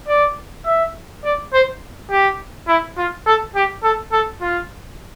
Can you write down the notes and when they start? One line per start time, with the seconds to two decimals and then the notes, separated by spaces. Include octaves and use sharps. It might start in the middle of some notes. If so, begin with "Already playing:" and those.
0.08 D5
0.66 E5
1.25 D5
1.53 C5
2.11 G4
2.68 E4
2.97 F4
3.26 A4
3.56 G4
3.84 A4
4.12 A4
4.41 F4